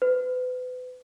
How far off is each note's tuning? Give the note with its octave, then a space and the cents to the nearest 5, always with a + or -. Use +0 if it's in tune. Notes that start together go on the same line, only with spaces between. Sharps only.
B4 +35